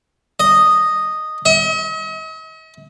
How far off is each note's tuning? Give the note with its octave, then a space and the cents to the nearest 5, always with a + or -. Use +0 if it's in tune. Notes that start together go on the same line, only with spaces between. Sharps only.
D#5 -5
D#5 +45